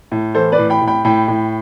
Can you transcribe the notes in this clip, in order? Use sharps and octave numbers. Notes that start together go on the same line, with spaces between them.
A2
E3 A4 C5
B4 D5
A2
G5 B5
A2
G5 B5
A2 G5 B5
A2